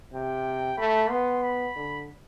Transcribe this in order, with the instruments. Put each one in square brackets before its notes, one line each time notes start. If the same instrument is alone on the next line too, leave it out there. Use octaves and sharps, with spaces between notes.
[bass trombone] C3 [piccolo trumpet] G5
[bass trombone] A3 [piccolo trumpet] B5
[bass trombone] B3 [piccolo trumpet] C6
[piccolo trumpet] B5
[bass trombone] D3